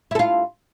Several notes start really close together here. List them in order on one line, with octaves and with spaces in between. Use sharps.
E4 A4 F4